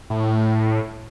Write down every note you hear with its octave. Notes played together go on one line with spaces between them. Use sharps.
A2